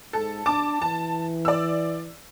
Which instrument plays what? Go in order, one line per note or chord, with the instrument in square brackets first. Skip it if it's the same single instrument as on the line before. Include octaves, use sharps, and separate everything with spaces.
[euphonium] G#2 [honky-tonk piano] A4
[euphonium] D4 [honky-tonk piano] A5 D6
[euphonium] E3 [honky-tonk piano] A5
[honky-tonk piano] D5 E6